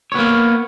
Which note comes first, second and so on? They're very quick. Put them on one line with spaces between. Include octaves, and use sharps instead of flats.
C#5 B3 A#3